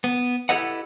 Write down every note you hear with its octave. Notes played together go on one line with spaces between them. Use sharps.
B3
E4 G4 A4 B4 D#5 F#5